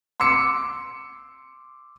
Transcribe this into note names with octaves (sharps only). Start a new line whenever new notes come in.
C6 D6 E6 C#7